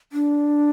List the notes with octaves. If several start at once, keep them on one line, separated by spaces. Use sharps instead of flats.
D4